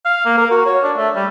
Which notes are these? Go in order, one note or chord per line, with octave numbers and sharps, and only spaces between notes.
F5
A#3
A#4
F#4
C#5
D4
A3
G3